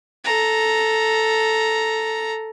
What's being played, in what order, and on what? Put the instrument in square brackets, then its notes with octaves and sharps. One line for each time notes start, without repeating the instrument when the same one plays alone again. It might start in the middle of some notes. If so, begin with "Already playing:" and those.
[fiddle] A4 A#5